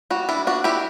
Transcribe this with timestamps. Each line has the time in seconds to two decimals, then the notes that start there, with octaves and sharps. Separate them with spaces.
0.10 G3 F#4
0.29 D4 E4
0.47 D4 F#4
0.64 G3 E4 G4